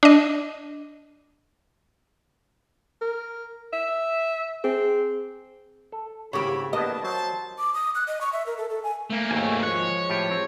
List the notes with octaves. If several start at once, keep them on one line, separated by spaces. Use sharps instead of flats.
D4 D#5
A#4
E5
C4 G#4
A4
G#1 C#3 A#3 E4 G4 C#5 B5
A2 A#3 B3 D4 D#5 A5
F#3 A#4 C5 A5
D6
D#6
F#6
D#5
C#6
E5
A#4
A4
A4
G#5
A3 A#3
G#1 D#2 C#5 G#5
F3 G#3 C#5 F#6
A2 F4 G4
C4